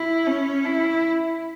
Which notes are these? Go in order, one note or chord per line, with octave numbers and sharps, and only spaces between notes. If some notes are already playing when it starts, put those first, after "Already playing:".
Already playing: E4
C#4
E4